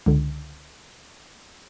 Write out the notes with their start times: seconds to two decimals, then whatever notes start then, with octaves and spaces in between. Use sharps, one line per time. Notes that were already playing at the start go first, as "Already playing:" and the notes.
0.06 C#2 D3